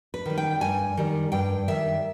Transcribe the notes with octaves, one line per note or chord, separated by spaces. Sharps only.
B4
D#3 G3
G5
G2 G#5
D#3 G3
G2 G5
D#3 G3 E5